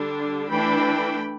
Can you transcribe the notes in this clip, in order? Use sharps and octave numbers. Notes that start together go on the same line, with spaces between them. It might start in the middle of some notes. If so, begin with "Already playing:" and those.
Already playing: D3 G3 D4
E3 A3 D4 G5 B5